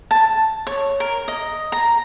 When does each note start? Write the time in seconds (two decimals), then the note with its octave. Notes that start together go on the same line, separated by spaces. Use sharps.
0.11 A5
0.67 C#5
1.00 A#4
1.28 D#5
1.72 A#5